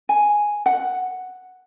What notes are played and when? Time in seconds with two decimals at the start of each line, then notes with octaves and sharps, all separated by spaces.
0.09 G#5
0.66 F#5